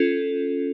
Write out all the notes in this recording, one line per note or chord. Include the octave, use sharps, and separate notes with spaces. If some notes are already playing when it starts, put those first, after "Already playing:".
Already playing: C#4 F4 A4